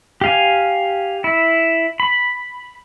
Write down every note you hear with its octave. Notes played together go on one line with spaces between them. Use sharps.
G4 F5 G#5
E4
B5